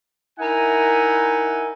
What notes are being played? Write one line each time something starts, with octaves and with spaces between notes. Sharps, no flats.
D#4 E4 A#4 E5 F#5 G#5